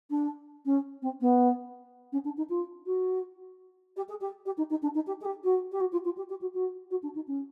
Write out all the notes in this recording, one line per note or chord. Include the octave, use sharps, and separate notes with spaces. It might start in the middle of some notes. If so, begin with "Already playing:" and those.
D4
C#4
C4
B3
C#4
D4
D#4
F4
F#4
G4
G#4
G4
G4
D#4
D#4
D4
D#4
G4
G#4
G4
F#4
G4
F#4
F4
F4
G4
G4
F#4
F#4
F#4
D4
D#4
C#4